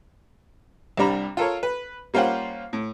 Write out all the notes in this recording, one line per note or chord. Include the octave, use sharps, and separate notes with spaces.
C2 C3 G3 D4 A#5 B5
F4 A4 A#4 C#5
B4
G3 A#3 C#4 F4 C5 F#5
A2